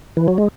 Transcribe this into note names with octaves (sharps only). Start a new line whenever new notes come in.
E3
F#3
G#3